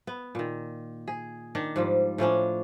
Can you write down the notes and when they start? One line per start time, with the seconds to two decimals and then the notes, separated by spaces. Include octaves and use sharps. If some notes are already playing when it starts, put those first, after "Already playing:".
0.07 B3
0.35 A#2 D#3
1.07 G#4
1.55 D#3 D4
1.76 G#2 F3 G3
2.18 A2 F3 C#4 D4